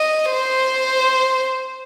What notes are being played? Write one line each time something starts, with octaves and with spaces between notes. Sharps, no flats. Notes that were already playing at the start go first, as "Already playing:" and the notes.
Already playing: D#5
C5